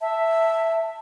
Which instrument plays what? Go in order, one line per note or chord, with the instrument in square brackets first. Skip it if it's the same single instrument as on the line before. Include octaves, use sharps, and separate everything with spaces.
[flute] E5 [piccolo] A5